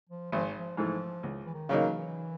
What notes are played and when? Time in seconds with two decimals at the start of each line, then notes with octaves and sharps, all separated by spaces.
0.09 F3
0.32 G#1 F3
0.58 F3
0.77 G#2 E3 F3 A3
1.23 C#2
1.46 E3
1.54 D#3
1.69 C#3 F#3 A#3 D#4
1.84 E3